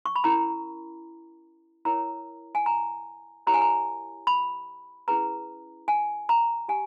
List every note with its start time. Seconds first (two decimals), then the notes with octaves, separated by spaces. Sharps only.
0.06 C#6
0.16 B5
0.24 C#4 E4 A#4 A#5
1.85 E4 A#4 C#5 A#5
2.55 G#5
2.66 A#5
3.47 E4 G4 A#4 C#5 A#5
3.54 G#5
3.62 A#5
4.27 B5
5.08 C#4 E4 G#4 B4 A#5
5.88 G#5
6.29 A#5
6.68 G4 G#5